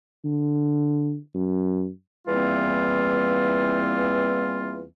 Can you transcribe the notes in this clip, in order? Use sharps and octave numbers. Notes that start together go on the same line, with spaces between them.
D3
F#2
E2 E3 G3 A#3 C4 F4